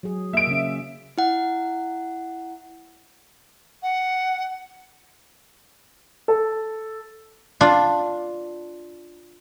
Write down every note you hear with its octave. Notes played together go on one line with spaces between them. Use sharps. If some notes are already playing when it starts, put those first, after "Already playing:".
F#3 G#4
A#3 D#5 E5 D7
C#3 C#4
E4 F#5
F#5
A4
D4 F4